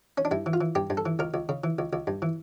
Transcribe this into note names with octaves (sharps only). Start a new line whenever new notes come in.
C#4
D4
G2 E4
E3
F4
E3
G2 G4
G2
A4
E3
C#2 A#4
C#2
C#3
E3
C#2
C#2
G2
E3